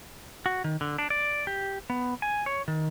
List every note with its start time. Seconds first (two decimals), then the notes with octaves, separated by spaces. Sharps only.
0.46 F#4
0.64 D#3
0.81 D3
0.98 D4
1.10 D5
1.47 G4
1.90 B3
2.22 G#5
2.46 C#5
2.68 D#3